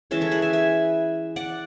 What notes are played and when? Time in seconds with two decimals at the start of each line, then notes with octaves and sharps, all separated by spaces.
0.11 E3 G#3 C#4 C#5 E5
0.21 A4 C#5
0.31 G#4 B4
0.42 E5 G#5
0.53 E5 G#5
1.36 D5 F#5